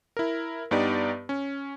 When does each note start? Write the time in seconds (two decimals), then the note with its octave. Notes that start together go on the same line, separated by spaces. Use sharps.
0.17 E4 A#4
0.71 G2 B3 D#4 G4 D5
1.29 C#4